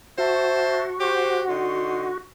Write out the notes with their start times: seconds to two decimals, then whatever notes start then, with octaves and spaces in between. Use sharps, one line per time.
0.18 F#4 C5 E5 A5
1.00 G4 C5
1.47 D3 D#4 C6